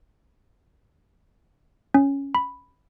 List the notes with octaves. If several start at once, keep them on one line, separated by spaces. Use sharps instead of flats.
C#4
B5